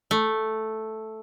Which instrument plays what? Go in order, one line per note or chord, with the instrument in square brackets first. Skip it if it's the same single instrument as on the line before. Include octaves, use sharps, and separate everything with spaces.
[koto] A3